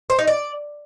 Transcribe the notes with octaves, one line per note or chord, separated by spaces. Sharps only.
C5
D#4
D5